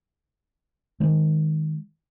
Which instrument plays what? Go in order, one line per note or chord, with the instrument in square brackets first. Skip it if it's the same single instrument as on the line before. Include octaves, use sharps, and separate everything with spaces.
[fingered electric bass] D#3 G#3